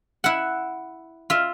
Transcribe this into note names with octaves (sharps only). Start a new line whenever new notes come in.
E4 F#5
F4 E5